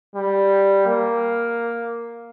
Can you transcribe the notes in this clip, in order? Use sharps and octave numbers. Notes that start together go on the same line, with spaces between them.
G3
A#3